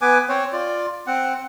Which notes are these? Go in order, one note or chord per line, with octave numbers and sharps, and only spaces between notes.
B3 B4 G#5 D6
C4 C5 C#5
F4 D5
C4 F#5